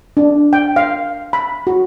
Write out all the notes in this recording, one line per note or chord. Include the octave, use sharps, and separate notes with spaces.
D4
G5
F5
B5
F#4